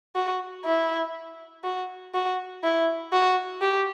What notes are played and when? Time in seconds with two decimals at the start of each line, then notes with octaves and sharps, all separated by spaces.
0.15 F#4
0.65 E4
1.64 F#4
2.14 F#4
2.63 E4
3.12 F#4
3.62 G4